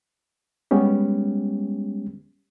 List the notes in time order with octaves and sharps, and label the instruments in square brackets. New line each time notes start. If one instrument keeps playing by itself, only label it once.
[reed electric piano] G3 G#3 B3 C#4 G4